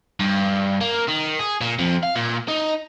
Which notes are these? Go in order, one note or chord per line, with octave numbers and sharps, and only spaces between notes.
G2
A#3
D#3
G#4
A#2
F2
F5
A#2
D#4